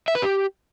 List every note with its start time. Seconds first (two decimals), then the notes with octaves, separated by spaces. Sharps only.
0.08 E5
0.15 B4
0.22 G4